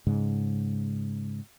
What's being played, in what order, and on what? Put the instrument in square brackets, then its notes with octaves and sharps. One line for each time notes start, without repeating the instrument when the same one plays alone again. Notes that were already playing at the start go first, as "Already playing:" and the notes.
[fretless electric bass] G#2 C#3 G#3